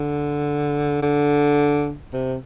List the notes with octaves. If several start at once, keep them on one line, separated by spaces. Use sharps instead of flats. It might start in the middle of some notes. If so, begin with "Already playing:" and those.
Already playing: D3
D3
C3